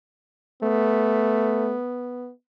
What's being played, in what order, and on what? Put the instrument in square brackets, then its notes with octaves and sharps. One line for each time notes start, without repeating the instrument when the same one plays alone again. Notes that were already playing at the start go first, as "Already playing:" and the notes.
[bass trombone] A3 [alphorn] B3